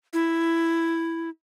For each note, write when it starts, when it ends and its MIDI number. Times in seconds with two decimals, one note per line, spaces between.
0.13 1.29 64